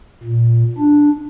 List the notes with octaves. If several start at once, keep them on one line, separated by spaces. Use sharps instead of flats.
A#2
D4